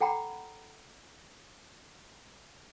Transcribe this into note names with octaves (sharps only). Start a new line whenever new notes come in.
A4 F#5 G5 A#5 B5